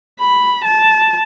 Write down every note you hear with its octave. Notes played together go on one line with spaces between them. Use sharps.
B5
A5